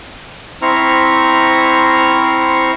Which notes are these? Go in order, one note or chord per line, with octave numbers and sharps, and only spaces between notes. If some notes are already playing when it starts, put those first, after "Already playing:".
C4 E4 C5 A#5 C#6 F6